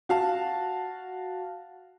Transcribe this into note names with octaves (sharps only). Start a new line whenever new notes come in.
F#4 F5 A5